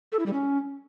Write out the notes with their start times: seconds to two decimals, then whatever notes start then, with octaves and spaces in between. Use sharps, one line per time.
0.12 A4
0.19 E4
0.26 G3
0.33 C#4